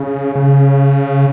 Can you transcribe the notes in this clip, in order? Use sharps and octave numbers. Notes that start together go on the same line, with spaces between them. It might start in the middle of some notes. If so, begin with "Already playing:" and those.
Already playing: C#3
C#3